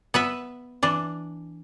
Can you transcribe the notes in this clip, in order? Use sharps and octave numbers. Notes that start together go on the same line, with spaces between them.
B3 B4 E5
E3 D4